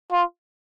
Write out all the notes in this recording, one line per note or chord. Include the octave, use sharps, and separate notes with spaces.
F4